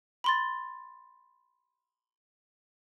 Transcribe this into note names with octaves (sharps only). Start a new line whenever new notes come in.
B5 C6 A6